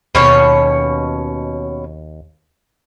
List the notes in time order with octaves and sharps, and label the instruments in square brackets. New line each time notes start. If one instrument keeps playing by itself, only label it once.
[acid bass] D#2 [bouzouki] B2 C#4 C#5